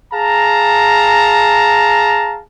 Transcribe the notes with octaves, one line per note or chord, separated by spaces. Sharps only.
G#4 F5 A5 A#5